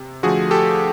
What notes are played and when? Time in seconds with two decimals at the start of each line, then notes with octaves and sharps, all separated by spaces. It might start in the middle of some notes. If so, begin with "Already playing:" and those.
Already playing: C3
0.23 D3 F3 A3 F#4 G#4
0.51 G4 A4